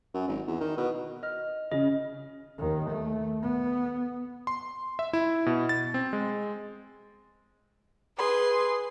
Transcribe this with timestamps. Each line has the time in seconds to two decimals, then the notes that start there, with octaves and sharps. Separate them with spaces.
0.14 F#2
0.28 G#1
0.47 E2
0.60 D#3
0.77 B2
1.23 D#5 F6
1.71 C#3 D#5
2.58 D#2 D#3
2.90 A3
3.42 B3
4.47 C6
4.99 E5
5.13 E4
5.46 B2
5.69 A6
5.94 C4
6.13 G#3
8.17 G#4 B4 C6